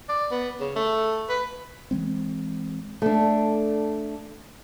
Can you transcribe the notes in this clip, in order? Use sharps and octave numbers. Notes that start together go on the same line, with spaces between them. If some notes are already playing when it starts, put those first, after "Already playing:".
D5
B3
C#3
A3
B4
E3 G#3 C4
A3 D4